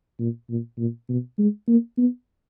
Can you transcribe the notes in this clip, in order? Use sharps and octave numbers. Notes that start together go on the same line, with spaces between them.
A#2
A#2
A#2
B2
G#3
A#3
B3